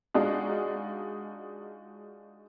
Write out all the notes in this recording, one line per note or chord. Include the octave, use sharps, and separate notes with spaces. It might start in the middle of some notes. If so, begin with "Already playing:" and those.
G#3 D4 D#4 F4 F#4